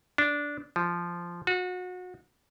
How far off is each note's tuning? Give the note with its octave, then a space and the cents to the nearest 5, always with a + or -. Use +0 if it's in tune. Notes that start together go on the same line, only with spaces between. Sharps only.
D4 -10
F3 -10
F#4 -30